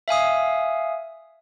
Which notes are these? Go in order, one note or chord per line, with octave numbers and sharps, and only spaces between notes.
E5 F5 G#5 D#6